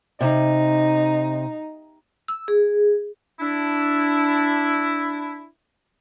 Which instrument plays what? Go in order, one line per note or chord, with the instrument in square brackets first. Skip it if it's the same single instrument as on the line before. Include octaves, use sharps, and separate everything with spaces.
[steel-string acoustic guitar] C3 [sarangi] D#4
[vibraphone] E6
G#4
[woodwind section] D4 E4